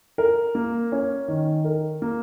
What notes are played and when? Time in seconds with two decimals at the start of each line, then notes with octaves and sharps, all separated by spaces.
0.18 A#4
0.55 A#3
0.92 C#4
1.28 D#3
1.65 A#4
2.02 A#3